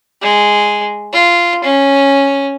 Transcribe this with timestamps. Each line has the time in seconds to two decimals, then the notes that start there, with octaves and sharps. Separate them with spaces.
0.22 G#3
1.12 F4
1.64 C#4